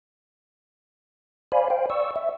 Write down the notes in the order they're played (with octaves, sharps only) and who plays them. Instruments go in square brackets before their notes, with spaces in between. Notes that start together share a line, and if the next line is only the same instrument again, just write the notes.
[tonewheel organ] C5 D5 F5 G#5 B5
C5 F5 G5
D5 C#6 E6
E5